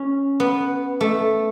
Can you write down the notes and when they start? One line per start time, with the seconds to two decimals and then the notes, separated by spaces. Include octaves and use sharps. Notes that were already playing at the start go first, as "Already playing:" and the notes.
Already playing: C#4
0.40 B3
1.01 A3